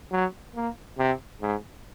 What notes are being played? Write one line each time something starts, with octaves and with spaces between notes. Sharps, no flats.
F#3
A#3
C3
G#2